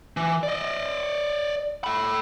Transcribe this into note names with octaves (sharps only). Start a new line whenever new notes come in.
E3
D5 D#5
A4 B5